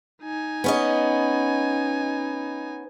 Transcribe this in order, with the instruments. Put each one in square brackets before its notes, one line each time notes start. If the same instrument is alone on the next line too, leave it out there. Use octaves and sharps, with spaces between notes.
[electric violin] D#4 G#5
[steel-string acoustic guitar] B3 C#4 D#5